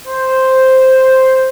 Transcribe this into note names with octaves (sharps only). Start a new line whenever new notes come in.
C5